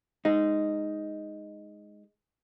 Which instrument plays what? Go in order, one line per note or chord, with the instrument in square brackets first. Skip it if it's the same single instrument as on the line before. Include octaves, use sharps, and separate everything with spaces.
[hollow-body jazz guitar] G#3 D#4